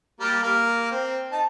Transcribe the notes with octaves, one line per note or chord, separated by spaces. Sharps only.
G3 A#3
A#3
C4
D#4 A5